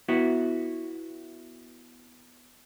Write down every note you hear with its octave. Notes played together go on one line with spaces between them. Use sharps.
B3 E4 F#4